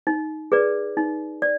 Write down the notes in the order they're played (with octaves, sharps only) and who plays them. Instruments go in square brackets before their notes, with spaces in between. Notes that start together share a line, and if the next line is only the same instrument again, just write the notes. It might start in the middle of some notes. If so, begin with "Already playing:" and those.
[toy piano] D#4
G#4 B4 D5
D#4
D5